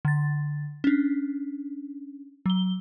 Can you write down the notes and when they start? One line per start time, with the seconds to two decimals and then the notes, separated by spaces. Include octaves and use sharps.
0.05 D3 A6
0.84 C#4 D4
2.46 F#3 G7